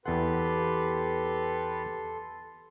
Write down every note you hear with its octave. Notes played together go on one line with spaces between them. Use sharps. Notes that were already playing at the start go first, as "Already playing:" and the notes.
E2 G4 A4 B4 F#5 C6